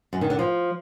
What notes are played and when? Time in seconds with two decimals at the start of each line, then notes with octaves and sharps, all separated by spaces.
0.13 F#2
0.21 D#3
0.30 D3
0.39 F3